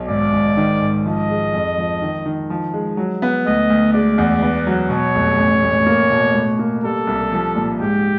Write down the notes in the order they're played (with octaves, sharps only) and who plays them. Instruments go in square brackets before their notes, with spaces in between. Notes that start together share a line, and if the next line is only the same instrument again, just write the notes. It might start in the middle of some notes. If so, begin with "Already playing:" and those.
Already playing: [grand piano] B1
[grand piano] G#1 [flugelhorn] D5
[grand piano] G#1
D#3
G#1
[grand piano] F3 [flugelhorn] D#5
[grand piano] G#3
F2
F3
D#3
D#3
F3
G#3
F#3
B3
[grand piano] D2 [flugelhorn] D#5
[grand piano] D2
[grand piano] G#3 [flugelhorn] D5
[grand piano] E2
B3
F#3
[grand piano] B2 [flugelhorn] C#5
[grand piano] F1
A1
A1
A#3
B2
A2
A#3
[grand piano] G3 [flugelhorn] A4
[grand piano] C2
F3
A#2
[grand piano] G#2 [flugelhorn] G4